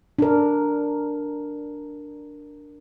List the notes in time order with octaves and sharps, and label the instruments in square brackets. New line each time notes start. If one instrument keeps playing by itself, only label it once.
[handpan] D4 A#4